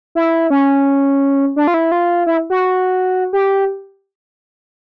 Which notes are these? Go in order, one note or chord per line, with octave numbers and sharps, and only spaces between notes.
E4
C#4
D4
F4
E4
F4
E4
F#4
G4